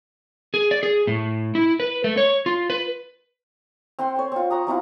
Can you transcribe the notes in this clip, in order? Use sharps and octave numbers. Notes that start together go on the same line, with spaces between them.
G#4
D5
G#4
A2
E4
B4
A3
C#5
F4
B4
C4 F#5 G5 C6
C#5 G5
C4 F4
F#5 A#5 C#6 D#6
F#3 C4 E4 F4